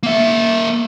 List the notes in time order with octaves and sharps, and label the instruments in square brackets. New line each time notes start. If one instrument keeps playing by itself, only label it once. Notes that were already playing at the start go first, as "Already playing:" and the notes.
[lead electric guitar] A#3 E5